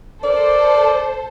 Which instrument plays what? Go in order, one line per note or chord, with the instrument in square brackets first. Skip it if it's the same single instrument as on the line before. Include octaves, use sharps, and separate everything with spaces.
[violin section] A4 C5 [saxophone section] A#4 D5